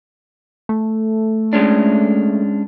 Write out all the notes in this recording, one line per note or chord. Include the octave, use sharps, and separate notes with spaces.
A3
G#3 C#4 D4